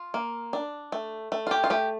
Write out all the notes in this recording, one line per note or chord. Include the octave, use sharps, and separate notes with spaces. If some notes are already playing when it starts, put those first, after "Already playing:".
Already playing: F4
A#3
D4
A3
A3
F4
G4
F4
A3 G4